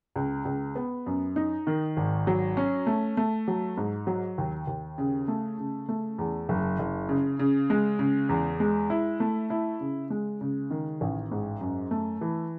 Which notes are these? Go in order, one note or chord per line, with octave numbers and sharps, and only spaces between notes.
C#2
C#2
B3
F#2
D#4
D#3
G#1
F#3
C#4
A3
A3
F#3
G#2
F#3
D#2
D#2
C#3
A3
C#3
A3
E2
F#1
F#1
C#3
C#3
G#3
C#3
E2
G#3
E4
A3
E4
C#3
G#3
C#3
D#3
A1
G#2
F#2
A3
E3